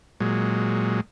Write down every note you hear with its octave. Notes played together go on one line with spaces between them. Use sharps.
A#2 F#3 G#3